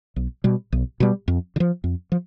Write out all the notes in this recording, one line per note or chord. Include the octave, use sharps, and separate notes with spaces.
B1
B2 G3
B1
B2 G3
F2
D3
F3
F2
F3